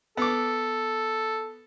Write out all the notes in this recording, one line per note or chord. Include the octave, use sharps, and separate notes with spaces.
B3 A4 D6